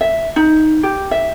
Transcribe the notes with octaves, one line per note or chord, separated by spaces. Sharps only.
E5
D#4
G4
E5